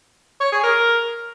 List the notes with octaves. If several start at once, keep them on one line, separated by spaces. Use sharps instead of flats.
C#5
G#4
A#4